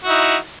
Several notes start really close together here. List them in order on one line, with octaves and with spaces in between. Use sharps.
F#4 E4 D#4